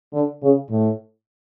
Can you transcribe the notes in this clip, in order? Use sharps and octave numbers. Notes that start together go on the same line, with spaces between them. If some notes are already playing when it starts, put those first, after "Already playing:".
D3
C#3
A2